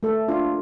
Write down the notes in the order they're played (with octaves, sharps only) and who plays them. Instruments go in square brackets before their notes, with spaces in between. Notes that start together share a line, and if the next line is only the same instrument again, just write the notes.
[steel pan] A3 A4
D4 F4